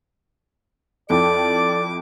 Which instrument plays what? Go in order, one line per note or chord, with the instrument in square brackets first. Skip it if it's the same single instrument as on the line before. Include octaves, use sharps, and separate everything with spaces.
[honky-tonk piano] F2 E4 G5 [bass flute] A4 [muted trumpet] D5 [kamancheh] D6